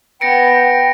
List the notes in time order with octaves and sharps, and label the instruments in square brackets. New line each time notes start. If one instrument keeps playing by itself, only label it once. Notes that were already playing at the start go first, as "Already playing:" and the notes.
[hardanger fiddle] B3 [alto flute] G5 [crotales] A#6 C#7 D7